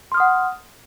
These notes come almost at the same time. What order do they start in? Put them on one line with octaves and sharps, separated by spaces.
C6 F6 D#6 F#5